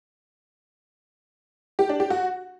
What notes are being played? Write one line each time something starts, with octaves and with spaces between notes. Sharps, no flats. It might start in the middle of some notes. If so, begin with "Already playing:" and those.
G4
D4
G4
F#4